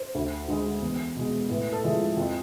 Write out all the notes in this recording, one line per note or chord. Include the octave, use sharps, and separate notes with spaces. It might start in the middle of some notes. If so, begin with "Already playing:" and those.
Already playing: C5
D2
D3 G#3
E2
B2 G#3
A2 B4
A4
F3 G#3 E4
F4
F2 F4